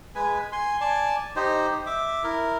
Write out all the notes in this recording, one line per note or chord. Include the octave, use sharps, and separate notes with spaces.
G#3 B4 G#5
G#5 C6
D5 G#5 A5
D#4 G4 C5
E5 D6
E4 A#4